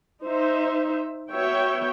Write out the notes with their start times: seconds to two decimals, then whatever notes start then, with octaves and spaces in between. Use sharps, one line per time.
0.24 D#4 C5 E5
1.31 B3 F#4 C#5 E5 G5